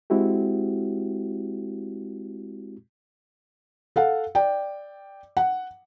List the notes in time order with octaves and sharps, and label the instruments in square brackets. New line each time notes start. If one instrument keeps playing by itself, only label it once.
[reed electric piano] G#3 C4 E4 F#4 G4
[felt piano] A4 F5 F#5
D5 G5
F#5